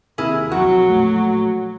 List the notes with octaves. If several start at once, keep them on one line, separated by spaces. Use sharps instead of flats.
D#2 C3 E4 G#4 A#4
B1 F2 F#3 F#4
A#1 A3